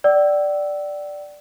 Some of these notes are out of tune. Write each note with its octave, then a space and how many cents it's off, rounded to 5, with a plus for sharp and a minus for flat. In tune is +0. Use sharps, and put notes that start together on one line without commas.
D5 +0 G5 -45 E6 -5